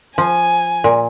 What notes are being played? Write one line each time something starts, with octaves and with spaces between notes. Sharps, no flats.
F3 G#5
A#2